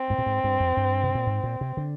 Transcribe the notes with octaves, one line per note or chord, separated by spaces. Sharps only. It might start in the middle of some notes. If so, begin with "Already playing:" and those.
Already playing: C4
G#2
A#2
G#2
G2
F2
G2
C3
A#2
G#2
A#2
C3
D3